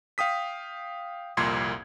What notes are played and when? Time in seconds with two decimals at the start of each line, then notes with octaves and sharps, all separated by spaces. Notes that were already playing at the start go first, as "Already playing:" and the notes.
0.18 F5 G5 D#6 B6
1.37 C2 F2 A#2 A#3 C6 G#6